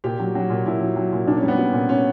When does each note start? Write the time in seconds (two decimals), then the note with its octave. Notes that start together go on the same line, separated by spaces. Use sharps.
0.04 A#2 G4
0.19 F#3
0.35 F#3
0.50 A#2
0.66 A#2 E4
0.82 F#3
0.96 F#3
1.12 A#2
1.27 A#2 D4
1.37 C#4
1.42 G3
1.48 B3
1.58 G3
1.73 A#2
1.89 A#2 C#4